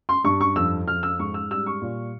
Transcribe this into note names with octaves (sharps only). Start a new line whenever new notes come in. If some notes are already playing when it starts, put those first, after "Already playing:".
C6
G2 C#6
C#6
F2 E6
F2 F6
E6
G#2 C#6
E6
G3 E6
C#6
A#2